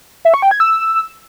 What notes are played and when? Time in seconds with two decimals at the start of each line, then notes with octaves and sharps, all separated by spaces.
0.25 E5
0.34 C#6
0.42 G5
0.51 G#6
0.60 E6